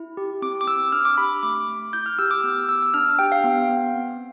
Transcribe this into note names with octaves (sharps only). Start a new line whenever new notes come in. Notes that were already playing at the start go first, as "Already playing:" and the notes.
Already playing: E4
G4
C4 D6
D6
C4 E6
D4 F6
D6
G4 B5
A3 D6
A3
E4 G6
F6
G4 E6
D6
F6
B3 E6
B3 E6
E6
D4 F6
G4 G5
F5
B3
B3
C4